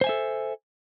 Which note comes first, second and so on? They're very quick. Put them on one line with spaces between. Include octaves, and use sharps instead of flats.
C5 G#5 E5 A4